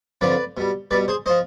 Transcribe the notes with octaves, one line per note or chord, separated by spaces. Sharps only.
F2 D3 F3 B4 D5
B2 G3
B2 G3 B4 D5
G#4 C5
F3 C5 D#5